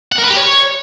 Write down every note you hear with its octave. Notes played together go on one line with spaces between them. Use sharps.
F#5
A#4
B4
G4
C#5